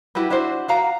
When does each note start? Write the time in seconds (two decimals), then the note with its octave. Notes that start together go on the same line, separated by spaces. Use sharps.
0.15 E4 F#4 G4 B4
0.30 D4 E4 F#4 C5
0.68 F#4 F5 A#5